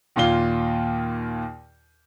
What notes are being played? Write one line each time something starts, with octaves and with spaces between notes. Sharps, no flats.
D#2 A#2 F4 G7